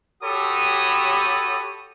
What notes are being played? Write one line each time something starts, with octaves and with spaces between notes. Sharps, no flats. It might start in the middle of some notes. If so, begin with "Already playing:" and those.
F#4 G4 A4 C#5 B5 D#6